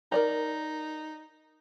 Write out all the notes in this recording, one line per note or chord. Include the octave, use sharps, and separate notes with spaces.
D#4 A#4 D5 A#5